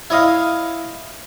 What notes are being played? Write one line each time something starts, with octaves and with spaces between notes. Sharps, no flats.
E4 C#5 D#5 F5